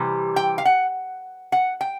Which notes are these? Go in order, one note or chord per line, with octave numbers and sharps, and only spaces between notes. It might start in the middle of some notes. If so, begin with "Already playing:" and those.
Already playing: C3 E3 G3
G5
F5
F#5
F#5
G5